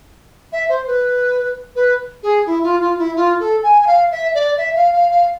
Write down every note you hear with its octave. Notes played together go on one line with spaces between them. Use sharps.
E5
C5
B4
B4
G#4
E4
F4
F4
E4
F4
A4
G#5
G#5
F5
E5
D5
E5
F5
F5
F5